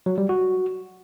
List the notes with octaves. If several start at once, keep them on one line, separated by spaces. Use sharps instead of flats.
F#3
G3
F#4